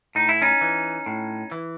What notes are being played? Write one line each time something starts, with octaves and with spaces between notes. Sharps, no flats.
A2 D#4
E4
C#4 D#4
E3
A2
E3